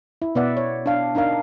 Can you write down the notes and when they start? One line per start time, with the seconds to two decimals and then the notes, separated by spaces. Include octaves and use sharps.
0.22 E4
0.35 B2 B3 B4 D5 E5 F#5
0.57 C#5
0.86 D4 F5
1.15 D4 D#4 A#4 F5